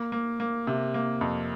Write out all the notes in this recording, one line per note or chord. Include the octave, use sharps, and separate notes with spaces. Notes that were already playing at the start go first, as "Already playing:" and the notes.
Already playing: A#3
A#3
A#3
C3
A#3
F2